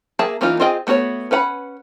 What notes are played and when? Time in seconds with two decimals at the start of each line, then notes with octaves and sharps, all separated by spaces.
0.19 A#3 G#4 E5 A5
0.41 E3 A#3 C#4 D#4 F4
0.60 C4 F4 G#4 D#5 G5
0.87 A3 B3 F#4 A#4 C#5
1.31 C#4 B4 F#5 A#5 B5